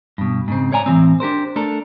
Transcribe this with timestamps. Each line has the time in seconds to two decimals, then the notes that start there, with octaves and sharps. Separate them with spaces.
0.18 G2 B2
0.48 G#2 C#3 C4
0.72 C#5 D5 G#5 A#5
0.86 A2 E3 F3 C4
1.20 D4 G4 A#4 C5
1.56 A3 D4 A4 A#4